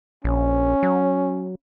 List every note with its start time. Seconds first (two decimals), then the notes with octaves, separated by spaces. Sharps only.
0.24 A#1 C#4
0.83 F#3